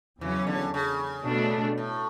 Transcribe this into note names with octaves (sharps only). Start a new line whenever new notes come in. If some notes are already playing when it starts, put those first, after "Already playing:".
E2 C#3 E3 F#3 C#4
D3
C#3
B2 A3 D4
A2